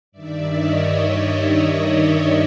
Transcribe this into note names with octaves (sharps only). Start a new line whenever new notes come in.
G2 D#3 D5 E5
C#5 D#5
C#5 D#5